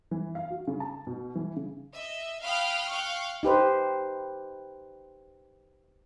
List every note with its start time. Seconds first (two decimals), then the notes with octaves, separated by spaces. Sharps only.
0.11 E3
0.35 F5
0.50 F#4
0.67 C#3
0.80 A5
1.07 B2
1.35 E3
1.56 C#3
1.95 D#5 E5
2.43 F5 G5 B5 D#6 F6 F#6
2.89 F5 G5 C#6 F#6
3.43 D#4 G4 B4 C5